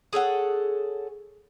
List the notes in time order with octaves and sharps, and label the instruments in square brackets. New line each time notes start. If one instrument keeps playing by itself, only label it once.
[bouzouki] G#4 A4 C#5 F#5